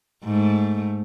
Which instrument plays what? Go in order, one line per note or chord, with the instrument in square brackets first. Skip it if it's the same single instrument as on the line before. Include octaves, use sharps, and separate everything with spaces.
[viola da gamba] G#2 A3